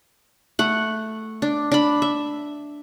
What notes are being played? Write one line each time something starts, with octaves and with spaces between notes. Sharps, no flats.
A3 F#5
D4
D4 B5
E5